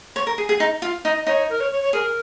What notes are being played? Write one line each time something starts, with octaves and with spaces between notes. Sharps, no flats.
C#5
A#4
G#4
G#4
D#4
F4
D#4 D#5
D#4 C#5
A#4
C#5
C#5
C#5
G#4 A#4